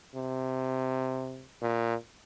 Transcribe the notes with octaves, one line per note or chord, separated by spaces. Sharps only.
C3
A#2